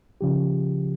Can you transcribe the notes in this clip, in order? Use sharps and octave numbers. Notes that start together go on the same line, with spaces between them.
C#3 F3 G4